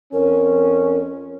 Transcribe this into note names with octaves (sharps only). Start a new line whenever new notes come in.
F2 C#4 A#4